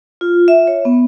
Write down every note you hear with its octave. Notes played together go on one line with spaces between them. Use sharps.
F4
E5
C#5
B3